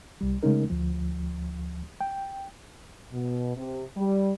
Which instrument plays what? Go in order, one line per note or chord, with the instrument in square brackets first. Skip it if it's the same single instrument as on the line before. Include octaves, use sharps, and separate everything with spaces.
[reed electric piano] C2 G3
C#3 G#3 A3 C#4 D#4 A#4
D2 F3
G5
[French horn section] B2
C3
G3